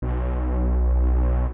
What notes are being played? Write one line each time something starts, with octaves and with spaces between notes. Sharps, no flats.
B1